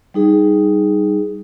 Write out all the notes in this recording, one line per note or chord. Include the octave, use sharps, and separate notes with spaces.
G3 D#4 G#4